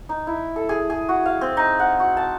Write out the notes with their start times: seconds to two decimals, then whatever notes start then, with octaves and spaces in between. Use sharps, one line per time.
0.09 D#4
0.27 E4
0.56 A4
0.69 G#4
0.90 G#4
1.09 F#4
1.26 F5
1.41 C4
1.57 D#4
1.80 F#5
2.00 F#4
2.17 A5